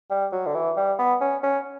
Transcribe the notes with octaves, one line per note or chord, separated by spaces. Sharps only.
G3
F#3
D3
E3
G3
B3
C#4
C#4